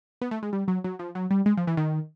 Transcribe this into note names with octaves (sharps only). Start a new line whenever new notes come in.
B3
A3
G#3
G3
F#3
F#3
F3
F#3
G3
G#3
F3
E3
D#3